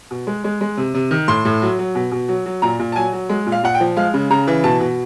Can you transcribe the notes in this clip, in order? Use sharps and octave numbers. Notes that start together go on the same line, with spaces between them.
B2
G#3
G#3
G#3
C3
C3
D#3
A2 C6
A2
F#3
F#3
B2
B2
F#3
F#3
A#2 A#5
A#2
A5
F#3 G#5
F#3
G#3
A#2
F5
A#2 F#5
G5
F3
G#3 F5
C#3
C#3 A#5
E3
B2 A5
B2